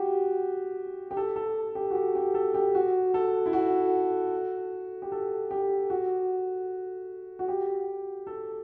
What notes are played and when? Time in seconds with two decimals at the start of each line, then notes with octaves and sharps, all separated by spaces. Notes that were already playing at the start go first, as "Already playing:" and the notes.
Already playing: F#4 G4
1.11 G4
1.17 A4
1.36 A4
1.75 G4
1.90 F#4
1.95 G4
2.15 G4
2.34 A4
2.54 G4
2.75 F#4
3.14 A4
3.46 E4
3.53 F#4
5.02 G4
5.12 A4
5.51 G4
5.90 F#4
7.39 F#4
7.48 G4
8.27 A4